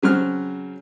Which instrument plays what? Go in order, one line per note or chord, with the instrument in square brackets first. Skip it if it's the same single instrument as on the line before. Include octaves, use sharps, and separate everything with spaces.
[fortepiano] C#3 F#3 C4 F6